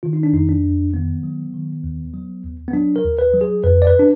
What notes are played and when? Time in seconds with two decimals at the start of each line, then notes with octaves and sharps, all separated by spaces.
0.03 D#3 F4
0.13 D#4
0.23 D4
0.33 F2 D#4
0.49 D4
0.64 F2
0.94 D#3 B3
1.23 F#3
1.54 D#3
1.84 D#2
2.14 F#3
2.44 D#2
2.68 B3
2.73 F#3 D4
2.96 A#4
3.04 D#2
3.19 B4
3.33 F#3
3.41 G#4
3.64 F2 B4
3.82 D5
3.87 B4
4.00 D4